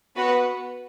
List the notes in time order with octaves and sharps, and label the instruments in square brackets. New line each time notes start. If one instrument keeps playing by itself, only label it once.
[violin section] B3 F#4 B4 F#5